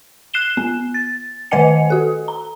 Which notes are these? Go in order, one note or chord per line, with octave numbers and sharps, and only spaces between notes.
F#6 C7 E7 G7
B3
A6
D#3 B4 D#5 F#5 G#5 C#7
F#4 A4
A#5